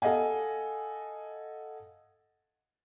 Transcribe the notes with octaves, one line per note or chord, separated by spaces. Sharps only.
A4 D#5 F5 F#5 G#5